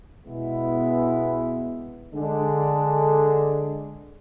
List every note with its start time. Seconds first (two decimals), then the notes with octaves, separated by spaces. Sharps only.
0.24 B2 G#3 B3 E4
2.14 D3 G#3 D4